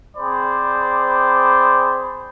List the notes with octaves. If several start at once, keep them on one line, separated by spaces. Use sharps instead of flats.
C4 G#4 C5 D5 B5